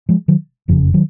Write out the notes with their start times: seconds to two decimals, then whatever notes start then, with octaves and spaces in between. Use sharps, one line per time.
0.09 F3 G#3
0.28 D#3 F#3
0.68 F#1 F2 C#3 F3
0.94 D#3 F#3